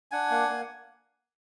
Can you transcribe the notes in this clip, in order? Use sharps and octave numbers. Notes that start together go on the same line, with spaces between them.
D4 F#5 G#5
A#3
A#3